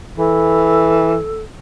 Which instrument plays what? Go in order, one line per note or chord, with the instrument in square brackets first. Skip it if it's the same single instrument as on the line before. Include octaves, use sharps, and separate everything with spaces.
[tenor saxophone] E3 [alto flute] A4